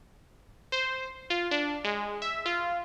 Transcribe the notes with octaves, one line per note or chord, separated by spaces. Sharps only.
C5
F4
D4
G#3
E5
F4